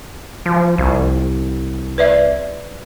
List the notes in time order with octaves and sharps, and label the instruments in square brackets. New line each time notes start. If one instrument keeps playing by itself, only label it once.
[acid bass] F3
C2
[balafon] B4 D5 E5